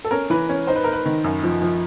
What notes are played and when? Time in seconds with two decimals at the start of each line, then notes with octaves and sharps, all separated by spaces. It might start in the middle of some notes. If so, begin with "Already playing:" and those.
0.05 A4
0.11 C#4 A#4
0.30 E3 B4
0.49 C#4
0.67 D#4 C5
0.76 B4
0.84 D#4 A#4
0.93 B4
1.06 D#3
1.24 F#2
1.43 F3
1.62 F3